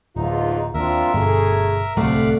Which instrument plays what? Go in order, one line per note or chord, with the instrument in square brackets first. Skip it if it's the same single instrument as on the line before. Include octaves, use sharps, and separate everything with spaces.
[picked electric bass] D1 [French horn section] E2 G#2 F4 [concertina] D#4
[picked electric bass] D#2 [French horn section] C4 D4 F4 [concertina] A#4 E5
[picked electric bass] G1 G2 B2 [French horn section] A3 G#4
[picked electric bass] D1 C2 [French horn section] G2 C3 [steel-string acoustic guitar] A3 [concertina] D5 F5 F#5